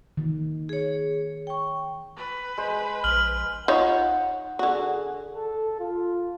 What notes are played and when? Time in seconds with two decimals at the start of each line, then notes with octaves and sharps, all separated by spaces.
0.17 D#3
0.69 G#4 C#5
1.47 G5 C#6
2.16 B4
2.57 G#3 C5
3.04 A#1 F6 F#7
3.68 D#4 F4 C#5 F#5
4.59 D3 F#4 G#4
5.34 A4
5.80 F4